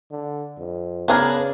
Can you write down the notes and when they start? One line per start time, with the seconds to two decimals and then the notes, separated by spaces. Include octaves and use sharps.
0.11 D3
0.58 F2
1.08 C#3 B3 D4 G#4 A#4